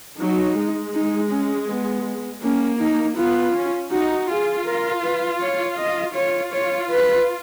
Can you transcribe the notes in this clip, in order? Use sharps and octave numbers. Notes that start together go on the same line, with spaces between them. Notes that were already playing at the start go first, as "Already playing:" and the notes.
F#3 D#4
G#3
D#4
C#4
B3
A#3 C#4
D#4
B3 F4
C#4
D#4 F#4
F4 G#4
A#4
B4
C#5
D#5
F4 C#5
C#5
B4